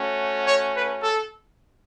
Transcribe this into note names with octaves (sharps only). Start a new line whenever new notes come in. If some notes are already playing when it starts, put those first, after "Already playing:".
Already playing: A3 C#4 F#4
C#5
B4
A4